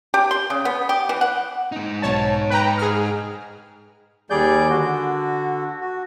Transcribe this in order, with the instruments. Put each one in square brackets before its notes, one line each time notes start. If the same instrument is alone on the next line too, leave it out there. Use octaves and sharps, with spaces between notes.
[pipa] G4
C6
C#3
B3
G4
E3
F#5
[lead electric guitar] G#2 D#4
[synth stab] B1 C#5 A5
B4 G5 A#5
G#4 F6
[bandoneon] D#2 G3 G#4 D5 G6
D3 F#4
F#4